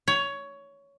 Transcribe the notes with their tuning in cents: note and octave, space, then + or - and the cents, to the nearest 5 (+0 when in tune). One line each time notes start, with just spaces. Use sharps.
C#5 +15